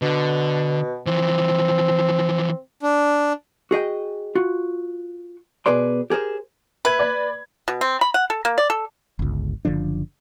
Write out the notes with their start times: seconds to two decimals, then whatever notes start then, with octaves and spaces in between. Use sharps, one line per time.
0.02 B2 D3
1.07 E3 F3 C4
2.82 D4
3.71 F#4 G#4 D#5 G5
4.35 F4 F#4
5.66 B2 G#4 B4 D5 C6
6.10 G4 G#4 A#4 C5
6.85 B4 E5 G#6
6.99 D5 B5 G#6
7.68 B2
7.81 C4
8.01 B5
8.14 F#5
8.30 A4
8.45 A#3
8.58 D5
8.70 A4
9.19 G1 C#2
9.65 F#1 D3 F3 D4